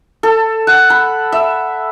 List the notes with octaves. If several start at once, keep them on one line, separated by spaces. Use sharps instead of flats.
A4
F#5
B5
E5